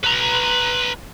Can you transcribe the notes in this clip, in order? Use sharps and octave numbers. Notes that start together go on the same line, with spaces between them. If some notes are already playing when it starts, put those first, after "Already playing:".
B4 A#5